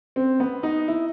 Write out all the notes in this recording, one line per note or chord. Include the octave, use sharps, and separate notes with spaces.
C4
B3
D#4
E4